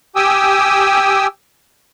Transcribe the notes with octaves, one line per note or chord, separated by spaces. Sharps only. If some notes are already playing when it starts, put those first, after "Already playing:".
G4 G5 G#5 D#6 E6